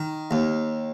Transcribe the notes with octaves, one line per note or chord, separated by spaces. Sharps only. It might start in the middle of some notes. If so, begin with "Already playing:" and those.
Already playing: D#3
D#2